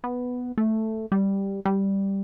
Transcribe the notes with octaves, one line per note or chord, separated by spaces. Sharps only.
B3
A3
G3
G3